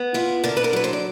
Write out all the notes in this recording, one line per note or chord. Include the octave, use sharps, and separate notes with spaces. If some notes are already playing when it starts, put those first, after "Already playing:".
Already playing: B3
E4 F4
D3 A#4
B4
A#4
F#3 B4
C5
D5